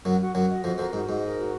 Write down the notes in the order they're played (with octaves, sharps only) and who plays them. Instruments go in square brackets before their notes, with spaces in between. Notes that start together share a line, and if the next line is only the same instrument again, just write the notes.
[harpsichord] F#2 F#3 [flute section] F#4
[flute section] F#4
[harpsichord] F#2 F#3 [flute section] F#4
[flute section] D#5
[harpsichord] F2 F3 [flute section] F#4
[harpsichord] F2 F3 [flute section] A#4
[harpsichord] G#2 [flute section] F#4
[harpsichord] G#2 [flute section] D#5
[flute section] A#4
F#4